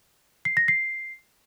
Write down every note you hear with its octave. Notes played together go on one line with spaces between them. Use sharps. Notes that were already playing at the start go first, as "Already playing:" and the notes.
C7
A#6
C7